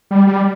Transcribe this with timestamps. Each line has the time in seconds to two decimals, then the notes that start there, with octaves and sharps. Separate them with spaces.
0.11 G3
0.27 G3